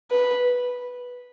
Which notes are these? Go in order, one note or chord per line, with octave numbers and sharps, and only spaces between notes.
B4